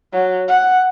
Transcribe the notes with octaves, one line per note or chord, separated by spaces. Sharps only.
F#3
F#5